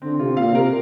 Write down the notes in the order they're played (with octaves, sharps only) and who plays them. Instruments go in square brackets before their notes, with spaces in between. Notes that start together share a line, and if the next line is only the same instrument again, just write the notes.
[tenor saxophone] D3 [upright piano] C4
[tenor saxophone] C3 [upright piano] F4
[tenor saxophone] A#2 [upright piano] F5
[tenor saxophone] C3 [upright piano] A#4